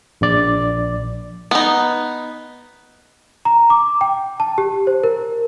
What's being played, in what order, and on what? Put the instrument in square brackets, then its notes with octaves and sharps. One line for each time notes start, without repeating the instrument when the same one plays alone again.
[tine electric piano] A#1 D5
[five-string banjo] B3 D#4
[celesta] A#5
D6
G5
A5
G4
C5
A#4